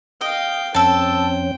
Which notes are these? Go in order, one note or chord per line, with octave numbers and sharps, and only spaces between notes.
D#5 F5 G5
F2 C4 C#4 A4 G5 A5